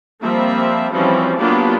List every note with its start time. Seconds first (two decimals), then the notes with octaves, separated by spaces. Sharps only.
0.23 F3 G3 A#3 C4 E5
0.93 E3 F3 G3 C4 C#4 F#4
1.38 F#3 A#3 B3 D4 F4 G4